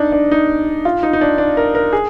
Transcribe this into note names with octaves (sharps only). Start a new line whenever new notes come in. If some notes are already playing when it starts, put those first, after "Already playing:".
Already playing: D4 D#4
D4
D#4
F4
D#4
D#4
D4
D4
A#4
A#4
G#4